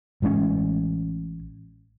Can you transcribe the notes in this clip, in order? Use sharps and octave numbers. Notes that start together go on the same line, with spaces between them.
A1 G#3 A#3 C#4